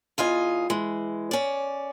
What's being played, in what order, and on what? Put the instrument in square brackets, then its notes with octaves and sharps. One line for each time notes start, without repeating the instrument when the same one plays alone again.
[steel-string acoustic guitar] E2 F4 D#5 G#5
E3 G#3
C#4 D5